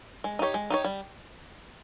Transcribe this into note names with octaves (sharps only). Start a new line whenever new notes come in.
G#3
D#4 G4 C#5
G#3
D#4 G4 C#5
G3